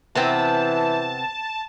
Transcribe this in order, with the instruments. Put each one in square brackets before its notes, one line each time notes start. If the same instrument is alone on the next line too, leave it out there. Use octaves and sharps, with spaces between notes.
[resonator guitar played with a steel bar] C3 B3 C4 [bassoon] E3 [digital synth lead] A5